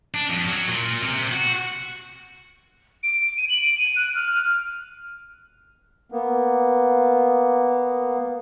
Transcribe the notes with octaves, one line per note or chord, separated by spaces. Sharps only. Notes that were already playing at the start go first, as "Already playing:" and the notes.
D4
F2
F#3
A#2
C3
F#4
D7
D#7
F#7
D7
D#7
F#6
F6
F6
A#3 B3